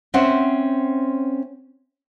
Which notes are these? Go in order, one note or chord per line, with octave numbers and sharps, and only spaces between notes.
C4 C#4 C5 E5 F#5